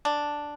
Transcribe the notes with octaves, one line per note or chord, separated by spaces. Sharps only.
D4